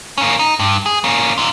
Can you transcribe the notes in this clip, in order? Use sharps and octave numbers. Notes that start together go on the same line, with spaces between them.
A#3 C#4
D#4
G2
G#4
A#3 C#4
D#4 F4